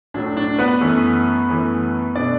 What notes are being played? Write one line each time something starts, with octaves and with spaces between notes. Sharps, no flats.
A2 F#3 A3 D4
D4
B3 B4
F#2 E3 A3
F#2 E3 A3
B2 A3 D4 D5